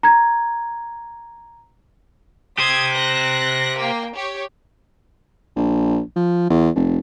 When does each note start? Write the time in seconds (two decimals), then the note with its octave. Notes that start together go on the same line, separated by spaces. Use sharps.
0.03 A#5 G#6
2.58 G4 C5 D#6 G#6
2.93 F#6 A#6
3.78 A#3 G5
4.16 G4 C#5
5.56 A#1
6.16 F3
6.50 E2
6.76 F1